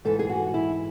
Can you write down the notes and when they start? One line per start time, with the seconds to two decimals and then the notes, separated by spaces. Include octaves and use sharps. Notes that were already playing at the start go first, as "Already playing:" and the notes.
0.05 G#2 E3 A4
0.19 G#4
0.29 F#4
0.54 E4